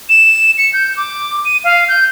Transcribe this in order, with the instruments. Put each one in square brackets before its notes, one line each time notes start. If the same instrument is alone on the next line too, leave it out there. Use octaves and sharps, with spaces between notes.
[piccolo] E7
C#7
G6
D6
D#7
F5
G6